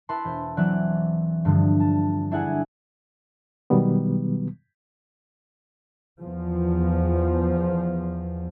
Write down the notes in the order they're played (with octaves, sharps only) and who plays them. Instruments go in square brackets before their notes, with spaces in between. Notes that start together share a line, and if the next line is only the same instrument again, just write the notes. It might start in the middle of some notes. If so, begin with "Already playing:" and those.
[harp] E4 B4 A5 C6
E1 C5
E3 F#3 C4 D5 F#6
G2 D3 F3
A5
D4 E4 G#4 F#5 G#5
[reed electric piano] B2 D#3 F#3 G3 B3
[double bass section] E2 F3